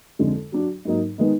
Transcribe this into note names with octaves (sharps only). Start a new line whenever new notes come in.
F2 D3 G#3
F#3 D4 F#4
G#2 F#3 A#3 D#4 A#4
D#3 G#3 B3 D#4